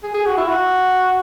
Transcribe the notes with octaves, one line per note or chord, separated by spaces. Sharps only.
G#4
G#4
F#4
E4
F#4